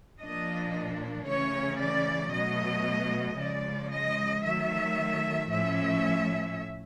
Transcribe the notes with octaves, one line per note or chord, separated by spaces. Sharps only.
A#2 F3 A#3 D4 D#5
C#3 E3 A3 C#4 C#5
D5
B2 F#3 A3 D#5
C#3 F3 G#3 D5
D#5
D#3 F#3 A3 E5
A2 F3 A3 C#4 E5